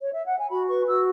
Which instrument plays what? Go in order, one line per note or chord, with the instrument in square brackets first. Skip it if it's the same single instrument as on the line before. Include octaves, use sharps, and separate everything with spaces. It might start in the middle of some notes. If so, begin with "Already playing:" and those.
[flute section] C#5
E5
F#5
G#5
F#4 B5
B4 C#6
F#4 E6